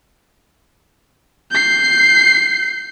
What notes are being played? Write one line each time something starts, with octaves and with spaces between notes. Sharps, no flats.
G6 C7